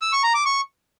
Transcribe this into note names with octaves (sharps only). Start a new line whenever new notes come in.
E6
C#6
A#5
D6
C#6